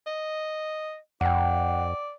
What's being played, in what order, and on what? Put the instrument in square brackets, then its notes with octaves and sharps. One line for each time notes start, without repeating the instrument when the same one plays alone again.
[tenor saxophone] D#5
[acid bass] F2 [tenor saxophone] D5 [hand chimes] F#5 G5